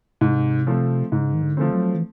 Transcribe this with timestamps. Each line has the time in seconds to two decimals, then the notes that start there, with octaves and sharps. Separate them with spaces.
0.21 G#2 C3
0.67 F3 A3 C4
1.12 G#2 C#3
1.34 D#3
1.43 D3
1.57 F3 A3 C4
1.73 F#3
1.95 E3